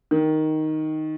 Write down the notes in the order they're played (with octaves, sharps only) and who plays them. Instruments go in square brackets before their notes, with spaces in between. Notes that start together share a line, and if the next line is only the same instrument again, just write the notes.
[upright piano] D#3